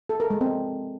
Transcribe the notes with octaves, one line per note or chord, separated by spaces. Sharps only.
A4
A#4
G#3
C4